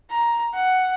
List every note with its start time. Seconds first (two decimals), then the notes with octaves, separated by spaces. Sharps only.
0.10 A#5
0.54 F#5